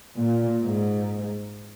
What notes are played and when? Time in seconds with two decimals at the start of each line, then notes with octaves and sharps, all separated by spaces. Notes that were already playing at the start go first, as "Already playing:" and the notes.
0.17 A#2
0.59 G#2